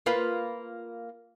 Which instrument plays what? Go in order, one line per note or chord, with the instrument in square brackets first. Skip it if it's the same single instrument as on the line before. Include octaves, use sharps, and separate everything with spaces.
[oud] A#3 F4 B4